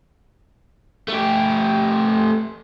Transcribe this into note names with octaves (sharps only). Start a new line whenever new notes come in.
A3 G4